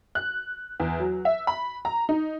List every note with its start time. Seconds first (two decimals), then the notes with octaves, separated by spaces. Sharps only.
0.15 F#6
0.80 E2
0.99 F#3
1.25 E5
1.47 B5
1.85 A#5
2.09 D#4